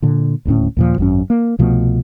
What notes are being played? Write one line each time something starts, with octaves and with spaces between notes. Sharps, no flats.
A#2 D3
D#1 D2 A2 C#4
D#2 A#2 F3
G#1 F#2 C#4
A#3
C2 B2 F3 A3